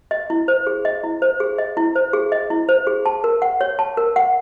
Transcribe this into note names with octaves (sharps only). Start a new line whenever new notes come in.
D#5
E4
C5
G#4
D#5
E4
C5
G#4
D#5
E4
C5
G#4
D#5
E4
C5
G#4
A5
A#4
F#5
C#5
A5
A#4
F#5